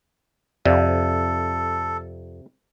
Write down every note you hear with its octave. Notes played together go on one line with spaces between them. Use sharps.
F2 C3 A4 D5 F5